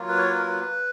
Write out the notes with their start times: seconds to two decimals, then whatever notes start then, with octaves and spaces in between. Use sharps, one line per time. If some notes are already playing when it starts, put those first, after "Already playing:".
Already playing: F#3 A#3 F4
0.08 B4
0.17 C#5
0.30 B4
0.38 A#4
0.47 B4